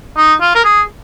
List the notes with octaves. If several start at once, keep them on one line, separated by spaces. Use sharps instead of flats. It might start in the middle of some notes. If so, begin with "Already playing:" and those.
D#4
F4
A#4
G#4